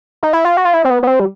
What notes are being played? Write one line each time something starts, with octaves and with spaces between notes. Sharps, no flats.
D#4
E4
F4
F#4
F4
E4
C4
B3
B3
C4
G3